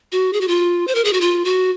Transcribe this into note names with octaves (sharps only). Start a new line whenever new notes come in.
F#4
G#4
F#4
F4
C5
A#4
G#4
F#4
F4
F#4